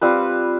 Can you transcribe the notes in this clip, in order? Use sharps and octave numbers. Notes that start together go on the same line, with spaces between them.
G3 C4 F4 B4